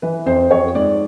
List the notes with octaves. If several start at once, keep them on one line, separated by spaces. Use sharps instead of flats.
E3 B4
F2 C5
F2 C#5
G#2 D5